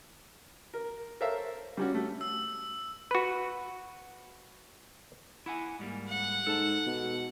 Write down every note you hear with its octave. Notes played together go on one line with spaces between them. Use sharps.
A#4
A4 A#4 C5 C#5 E5 F5
G3 C#4 F#4
A3
E6
F#4 B4
E4 F#5 G#5
G#2 G3 A#3
F#5
G#2 A4 A5
B2